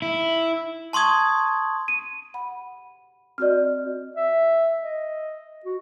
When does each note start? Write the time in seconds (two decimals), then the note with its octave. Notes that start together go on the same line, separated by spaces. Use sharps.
0.02 E4
0.93 A5 C6 C#6 D#6 G#6
1.88 D#7
2.34 F#5 B5
3.38 C4 F#4 D5 D#5 F6
4.16 E5
4.82 D#5
5.65 F#4